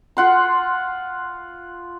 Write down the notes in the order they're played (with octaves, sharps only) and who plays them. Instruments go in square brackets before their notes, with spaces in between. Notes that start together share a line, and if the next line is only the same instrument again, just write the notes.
[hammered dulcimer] F4 F#5 C6